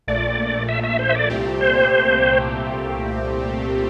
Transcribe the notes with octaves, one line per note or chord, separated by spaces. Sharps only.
A#1 A#2 A3 D5
E5
E5
C5
E5
D5
C2 A#2 A3 C4 G4
C5